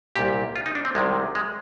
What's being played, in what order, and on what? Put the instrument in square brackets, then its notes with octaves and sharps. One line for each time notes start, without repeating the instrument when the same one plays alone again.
[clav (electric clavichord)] C2 A#2 G4
F4
D#4
D4
C4
C2 C3 D#3 G#3
G#3